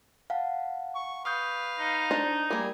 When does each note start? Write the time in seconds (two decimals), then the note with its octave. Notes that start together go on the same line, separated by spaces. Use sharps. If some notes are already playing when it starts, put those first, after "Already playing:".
0.30 F5 F#5 A5
0.95 C#6
1.25 B4 F5 C#6 D#6 G6
1.79 D#4
2.11 D4 C5 D#5
2.50 G3 A#3 G#4 A#4